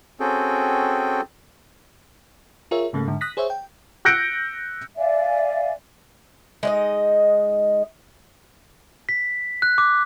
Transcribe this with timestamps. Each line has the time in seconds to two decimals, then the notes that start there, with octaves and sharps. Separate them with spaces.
0.20 C4 C#4 F#4 G#4 A4 G5
2.71 F4 G#4 A#4 C#5 E5
2.93 G#2 C#3 A3 A#3
3.08 G#2 D3
3.21 D#6 F#6 A#6 B6
3.37 G#4 C5 C#5 E5
3.50 G5
4.05 E6 F#6 G6 A#6 C#7 D7
4.97 D5 E5 F5 G#5
6.63 G#3 D#4 D#5
9.09 B6
9.62 F#6
9.78 D6